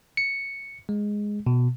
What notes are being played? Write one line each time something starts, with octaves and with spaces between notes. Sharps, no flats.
C#7
G#3
B2